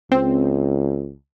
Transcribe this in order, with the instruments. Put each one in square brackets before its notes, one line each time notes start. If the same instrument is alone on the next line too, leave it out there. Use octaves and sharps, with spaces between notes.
[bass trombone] C#2 [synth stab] C4